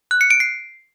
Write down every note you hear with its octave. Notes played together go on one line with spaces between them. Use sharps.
F#6
C#7
D7
C7